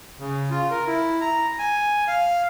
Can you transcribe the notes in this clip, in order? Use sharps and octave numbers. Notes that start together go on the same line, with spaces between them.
C#3
F4
A#4
E4
A#5
G#5
F5